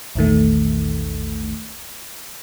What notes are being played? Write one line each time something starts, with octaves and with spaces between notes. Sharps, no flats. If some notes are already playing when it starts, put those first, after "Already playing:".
A#1 E2 D#3 A3